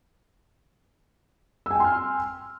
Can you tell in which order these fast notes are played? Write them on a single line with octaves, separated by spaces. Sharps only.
E6 G#5 G5 C6 F6